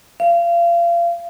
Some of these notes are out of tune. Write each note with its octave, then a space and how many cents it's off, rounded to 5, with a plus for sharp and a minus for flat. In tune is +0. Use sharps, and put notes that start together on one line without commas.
F5 -30